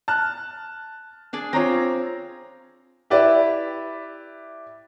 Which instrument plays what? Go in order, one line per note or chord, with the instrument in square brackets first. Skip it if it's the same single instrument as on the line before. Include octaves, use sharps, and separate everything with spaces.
[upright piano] A5 F6 F#6
[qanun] D4 G#4 D5
[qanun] C4 F4 [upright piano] C#5 A#5 A#6
[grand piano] E4 G4 B4 D5 E5